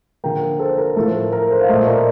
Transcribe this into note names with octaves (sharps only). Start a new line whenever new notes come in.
D3 F3 A#3 G5 A#5
A4 C5
A#4
A2 F3 A3 A4
A#4
A#4
A4 C5
F5
A#2 A3 C5 D#5
A#4 D5